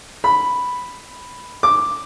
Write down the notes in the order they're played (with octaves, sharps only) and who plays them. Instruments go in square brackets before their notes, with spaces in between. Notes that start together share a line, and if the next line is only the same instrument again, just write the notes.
[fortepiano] B5
D6